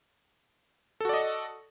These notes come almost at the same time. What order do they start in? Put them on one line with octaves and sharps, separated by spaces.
A4 F#4 D5 D#5